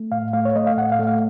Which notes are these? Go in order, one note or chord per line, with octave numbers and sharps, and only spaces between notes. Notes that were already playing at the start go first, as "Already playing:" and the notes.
Already playing: A3
A2 F5
A3 F5
C#5
A3 D#5
F5
A2 F#5
F5
A3
F5